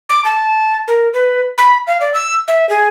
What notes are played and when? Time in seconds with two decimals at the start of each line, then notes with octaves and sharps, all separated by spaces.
0.09 D6
0.25 A5
0.88 A#4
1.14 B4
1.58 B5
1.87 F5
2.01 D5
2.14 E6
2.48 E5
2.69 G#4